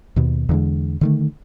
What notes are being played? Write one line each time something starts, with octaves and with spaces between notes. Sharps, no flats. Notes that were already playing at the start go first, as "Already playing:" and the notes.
D#2 B2
E2 D3 G#3
D3 D#3 A3